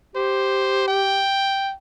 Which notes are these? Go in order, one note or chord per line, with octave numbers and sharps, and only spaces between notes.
G4 C5
G5